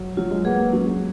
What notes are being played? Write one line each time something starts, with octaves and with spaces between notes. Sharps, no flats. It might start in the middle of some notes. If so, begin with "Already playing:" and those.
Already playing: F#3
F#3 F4
G#3
A#3 G#4 B4 F#5
G#3
F#3 C#4